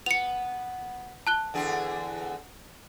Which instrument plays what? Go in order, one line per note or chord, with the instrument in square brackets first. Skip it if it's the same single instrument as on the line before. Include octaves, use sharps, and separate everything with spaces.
[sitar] B3 [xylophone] C#7 F7
[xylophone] A5 F#6 G7
[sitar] E2 D3 G#4